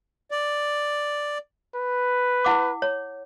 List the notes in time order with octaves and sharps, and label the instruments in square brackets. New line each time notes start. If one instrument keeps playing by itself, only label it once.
[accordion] D5
[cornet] B4
[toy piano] E4 F#5 D6
C#5